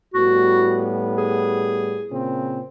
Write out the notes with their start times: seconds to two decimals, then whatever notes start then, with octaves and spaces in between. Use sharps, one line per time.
0.14 A2 G3 B3 F#4
1.17 G#4
2.09 A#2 C#3 C4